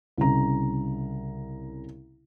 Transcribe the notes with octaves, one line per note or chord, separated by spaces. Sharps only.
C2 C#3 A#5